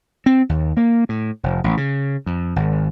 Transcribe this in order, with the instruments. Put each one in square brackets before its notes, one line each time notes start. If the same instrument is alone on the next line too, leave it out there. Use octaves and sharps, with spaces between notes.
[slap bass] C4
D#2
A#3
A2
F1
A1
C#3
F2
G#1